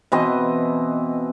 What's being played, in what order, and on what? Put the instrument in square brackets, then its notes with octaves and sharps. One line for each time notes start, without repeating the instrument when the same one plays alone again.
[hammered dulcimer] B2 E3 C4 D#5